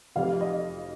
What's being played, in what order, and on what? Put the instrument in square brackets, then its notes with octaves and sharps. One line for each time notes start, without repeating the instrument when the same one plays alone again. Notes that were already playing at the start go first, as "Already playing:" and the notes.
[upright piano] F1 F2 C3 F5
D#5